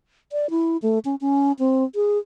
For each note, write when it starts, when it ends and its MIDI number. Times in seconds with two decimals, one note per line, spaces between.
0.32 0.50 74
0.50 0.77 64
0.82 0.99 57
1.05 1.15 61
1.21 1.52 61
1.59 1.84 60
1.95 2.18 68